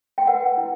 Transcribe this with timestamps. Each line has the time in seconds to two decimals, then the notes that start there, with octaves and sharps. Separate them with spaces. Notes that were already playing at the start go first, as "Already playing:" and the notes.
0.18 G5
0.27 B4 F#5
0.58 E4